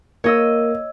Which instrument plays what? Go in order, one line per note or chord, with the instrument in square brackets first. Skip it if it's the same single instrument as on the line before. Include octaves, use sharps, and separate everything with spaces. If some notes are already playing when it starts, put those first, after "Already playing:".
[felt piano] A#3 [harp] C#5 D#5 E6